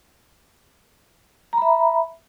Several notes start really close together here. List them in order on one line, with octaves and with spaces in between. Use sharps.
A#5 B5 E5